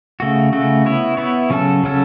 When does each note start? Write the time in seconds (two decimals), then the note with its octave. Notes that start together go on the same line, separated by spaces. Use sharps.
0.20 C#3 A3 F#4
0.53 C#3 A3 F#4
0.85 B3 E4 C#5
1.17 B3 E4 C#5
1.50 C#3 F#3 C#4 A4
1.83 C#3 F#3 C#4 A4